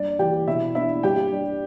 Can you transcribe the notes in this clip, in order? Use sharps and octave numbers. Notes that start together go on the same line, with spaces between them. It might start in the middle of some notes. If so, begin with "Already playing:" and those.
Already playing: G2 D4 D5
E3 G3 G4 G5
B2 E4 E5
B3 D4 E4 E5
G2 G4 G5
G3 D4